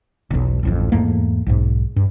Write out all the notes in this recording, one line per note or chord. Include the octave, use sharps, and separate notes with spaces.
E1 B1
D1 A1 F2
E2 G#2 A3 A#3
B1 G#2
G2